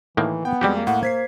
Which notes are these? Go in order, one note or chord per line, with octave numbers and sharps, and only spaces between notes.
A2 D#3 E3 A#3
B3 G5
F2 G3 G#3 F#4 G4
A#3
A2 F#5
C5 G#6 B6 C7